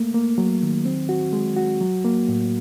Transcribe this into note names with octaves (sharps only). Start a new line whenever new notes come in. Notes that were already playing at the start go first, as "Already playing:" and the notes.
Already playing: A3 A#3
A#3
F#3
D#3
C4
F#4
G#3
F#4
F#3
A#3
A2